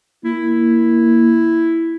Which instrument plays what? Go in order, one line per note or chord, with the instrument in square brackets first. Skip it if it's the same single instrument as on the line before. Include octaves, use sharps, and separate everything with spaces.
[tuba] A#3 [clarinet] E4